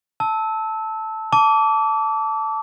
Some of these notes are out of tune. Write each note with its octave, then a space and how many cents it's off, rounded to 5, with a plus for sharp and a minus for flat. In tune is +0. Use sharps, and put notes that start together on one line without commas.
A5 +0 E6 -20
A5 +0 D6 -30